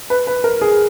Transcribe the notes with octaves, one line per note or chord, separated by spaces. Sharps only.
B4
B4
A#4
G#4